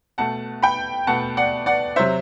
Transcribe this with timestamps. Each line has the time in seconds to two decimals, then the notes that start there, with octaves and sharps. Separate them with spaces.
0.18 B2 A3 F#5 A5
0.63 G5 B5
1.07 B2 A3 F#5 A5
1.37 D5 F#5
1.66 D5 F#5
1.96 C3 F#3 C5 E5